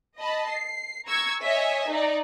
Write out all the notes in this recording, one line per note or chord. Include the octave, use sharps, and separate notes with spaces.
D#5 A5 B5
C7
A#5 C#6 E6 G#6
C#5 D#5 E5 G#5
D#4 D5